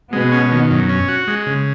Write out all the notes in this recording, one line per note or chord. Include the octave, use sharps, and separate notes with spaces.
B2 G#3 B3
C#4
D#3
F#2
C#4
F#4
G#3
C#3